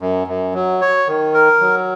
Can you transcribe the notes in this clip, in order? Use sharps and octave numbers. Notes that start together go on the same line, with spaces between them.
F#2
F#2
F#3
C#5
D#3
A#4
F#3